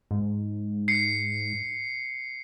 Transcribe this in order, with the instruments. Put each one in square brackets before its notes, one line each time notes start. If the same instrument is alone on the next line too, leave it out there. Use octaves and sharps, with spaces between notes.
[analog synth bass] G#2
[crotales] C7 C#7